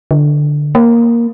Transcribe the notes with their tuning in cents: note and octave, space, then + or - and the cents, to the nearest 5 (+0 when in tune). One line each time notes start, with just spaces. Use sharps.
D3 +5
A#3 +5